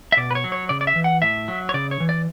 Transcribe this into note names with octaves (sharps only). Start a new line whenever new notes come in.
E5
B2 D5
B4
C#5
F#3
C#5
C#3 D5
D5
E5
E3
F#5
A2 E5
F#3
C#5
C#3 D5
C#5
E3
D5